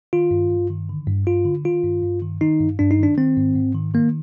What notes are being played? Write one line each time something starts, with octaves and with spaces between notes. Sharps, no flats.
D#3 F4
G2
G2
D#3
D3
G2
G2 F4
D3
D#3 F4
G2
G2
D#3
D#3 D#4
G2
G2 D4
D#4
D#3 D4
D#3 C4
G#2
G#2
D#3
D#3 A#3